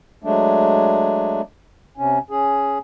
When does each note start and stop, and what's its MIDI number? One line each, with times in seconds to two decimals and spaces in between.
0.24 1.41 54
0.24 1.41 56
0.24 1.41 57
0.24 1.41 62
1.97 2.19 48
1.97 2.19 61
2.31 2.78 61
2.31 2.78 68